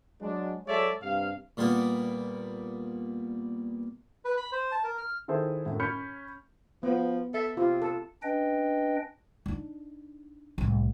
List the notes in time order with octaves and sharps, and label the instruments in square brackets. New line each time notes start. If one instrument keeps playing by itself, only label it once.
[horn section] F#3 G#3 D4
F#3 G#3 A4 C#5 D5 E5
G2 C3 F5
[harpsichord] A#2 G3 A#3 B3 A#4
[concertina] B4
B5
C5
A5
A#4
F6
[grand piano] D#3 E4 G#4 A4 C5
F#2 A2
C#4 B5 F6 G6 C#7
[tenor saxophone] F3 [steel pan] B3
[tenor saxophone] A4 [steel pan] E5
[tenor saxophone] C3 [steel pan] F4
[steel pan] A4
[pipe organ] C#4 D4 B4 D#5 G5
[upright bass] D4 D#4
C2 A2